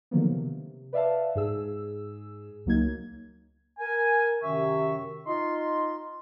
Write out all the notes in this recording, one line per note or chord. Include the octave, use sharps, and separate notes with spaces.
D3 D#3 F3 F#3 A#3 B3
C3
B4 D5 E5 F5 A5
G#2 G#4 E6
C#2 F#3 A#3 D#4 G#6
A#4 G#5
F#2 C3 D#3 E5 C#6
D#4 F4 C6